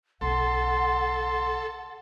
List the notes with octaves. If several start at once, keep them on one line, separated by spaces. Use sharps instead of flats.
B1 C#3 A4 F#5 C6